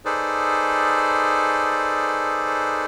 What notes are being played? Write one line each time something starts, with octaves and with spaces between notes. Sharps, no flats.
D#4 G#4 A4 B4 C5 D5